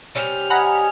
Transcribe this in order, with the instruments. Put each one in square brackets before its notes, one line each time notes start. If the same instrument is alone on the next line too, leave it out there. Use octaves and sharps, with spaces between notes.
[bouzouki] C3 G3 C#4 [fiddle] F6
[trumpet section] D#5 G#5 [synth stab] F#5 A#5 B5